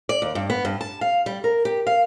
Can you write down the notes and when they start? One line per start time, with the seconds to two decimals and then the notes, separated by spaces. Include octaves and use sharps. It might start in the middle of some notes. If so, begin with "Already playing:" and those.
0.09 D5
0.22 D#2
0.35 G2
0.50 B3
0.65 G2
0.81 A5
1.01 F5
1.26 G3
1.44 A#4
1.65 G4
1.87 F5